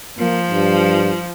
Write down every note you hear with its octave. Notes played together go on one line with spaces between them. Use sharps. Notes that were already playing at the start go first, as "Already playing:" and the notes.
F3 A#3
G2